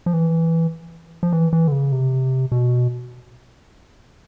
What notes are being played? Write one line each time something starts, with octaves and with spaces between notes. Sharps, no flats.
F3
E3
F3
E3
E3
D3
C#3
C3
B2